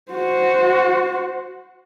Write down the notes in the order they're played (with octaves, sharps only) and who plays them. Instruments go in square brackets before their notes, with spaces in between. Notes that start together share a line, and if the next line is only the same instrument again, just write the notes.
[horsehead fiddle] F#4 C5